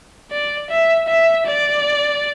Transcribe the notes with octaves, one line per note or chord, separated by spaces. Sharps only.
D5
E5
E5
D5